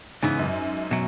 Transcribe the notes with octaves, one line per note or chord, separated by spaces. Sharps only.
C#2 G#2 C#3 E3 B3
F#2
B2 F#3